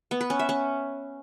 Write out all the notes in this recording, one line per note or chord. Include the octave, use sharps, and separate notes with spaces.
B3
B4
C#4
E5
C#4